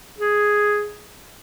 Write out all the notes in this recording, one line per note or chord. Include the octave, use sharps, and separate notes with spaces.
G#4